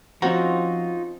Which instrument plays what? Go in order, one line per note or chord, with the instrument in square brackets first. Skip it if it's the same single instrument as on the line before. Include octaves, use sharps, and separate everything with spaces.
[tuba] F3 [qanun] C4 C#4 [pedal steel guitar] D#4 F4 A#5 [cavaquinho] F#4